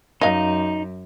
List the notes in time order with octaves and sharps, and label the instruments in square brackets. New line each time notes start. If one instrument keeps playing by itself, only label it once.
[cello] F#2 [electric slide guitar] D#4 [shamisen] D#5 F5